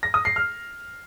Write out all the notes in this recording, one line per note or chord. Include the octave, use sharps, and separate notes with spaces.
A#6
D#6
C7
F6